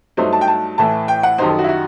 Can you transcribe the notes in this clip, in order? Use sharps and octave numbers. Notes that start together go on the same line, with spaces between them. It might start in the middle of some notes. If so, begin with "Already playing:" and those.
G2 F#3 A3 D#4 C5
A5
G5
A5
A2 E3 A3 A5
G5
F#5
F#2 D#3 G3 D#4 C5
A4
F#4
E4
F#4